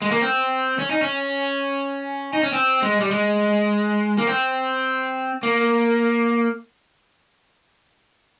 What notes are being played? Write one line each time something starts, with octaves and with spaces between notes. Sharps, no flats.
G#3
A#3
C4
C#4
D#4
C#4
D#4
C#4
C4
G#3
G3
G#3
A#3
C4
A#3